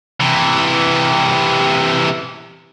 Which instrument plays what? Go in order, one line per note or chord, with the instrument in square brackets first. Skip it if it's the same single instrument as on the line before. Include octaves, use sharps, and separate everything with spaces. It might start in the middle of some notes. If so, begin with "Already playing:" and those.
[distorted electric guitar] C3 E3